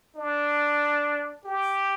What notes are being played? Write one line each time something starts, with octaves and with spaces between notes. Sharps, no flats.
D4
G4